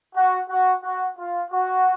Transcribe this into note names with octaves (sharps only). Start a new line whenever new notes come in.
F#4
F#4
F#4
F4
F#4